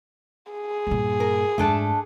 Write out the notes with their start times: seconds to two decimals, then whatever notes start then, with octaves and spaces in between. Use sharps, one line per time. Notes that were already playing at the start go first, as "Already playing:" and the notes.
0.52 G#4
0.87 G2 A#2
1.20 A#4
1.58 F2 G#2 A3 D4 A4